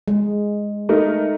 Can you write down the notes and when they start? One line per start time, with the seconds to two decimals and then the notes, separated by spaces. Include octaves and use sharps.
0.08 G#3
0.89 A3 D#4 A#4